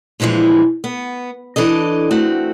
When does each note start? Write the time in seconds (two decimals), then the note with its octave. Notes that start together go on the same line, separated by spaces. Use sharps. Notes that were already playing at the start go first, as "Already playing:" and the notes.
0.20 A#2 D3 E3 F3 G#3
0.84 B3
1.56 E3 D4 A4 D#5
2.11 A3 C4 F#4